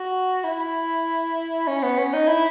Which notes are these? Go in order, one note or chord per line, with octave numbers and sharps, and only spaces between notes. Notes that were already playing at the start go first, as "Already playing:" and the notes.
Already playing: F#4
E4
C#4
B3
C#4
D#4
E4